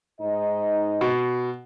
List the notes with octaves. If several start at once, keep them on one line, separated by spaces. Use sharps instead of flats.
G#2 D#4 D#5
B2